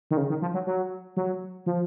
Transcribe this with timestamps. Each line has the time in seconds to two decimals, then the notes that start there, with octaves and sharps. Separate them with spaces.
0.11 D#3
0.17 C#3
0.30 D#3
0.42 F3
0.54 F#3
0.67 F#3
1.17 F#3
1.66 F3